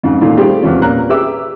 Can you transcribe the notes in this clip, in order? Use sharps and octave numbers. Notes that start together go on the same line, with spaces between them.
F2 G#2 C#3
A#2 D#3 E3 A3 D#4 F4
G3 A3 C4 F4 G4 G#4
E2 C3 F3 C#4
A#2 C#4 A#4 A#5 F#6
G4 G#4 B4 E5 D6 E6